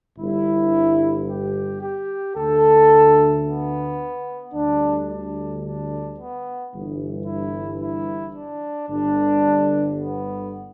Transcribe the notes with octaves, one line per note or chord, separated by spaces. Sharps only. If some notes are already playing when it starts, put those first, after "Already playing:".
G1 G2 G3 E4
G4
G4
D2 D3 A3 A4
B3
D2 D3 G3 D4
D4
D4
B3
G1 G2 E3
E4
E4
D4
G1 G2 D3 D4
B3